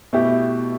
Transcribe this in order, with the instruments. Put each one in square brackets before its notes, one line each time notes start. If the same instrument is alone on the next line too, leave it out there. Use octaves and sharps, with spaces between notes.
[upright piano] B2 A3 E4 G4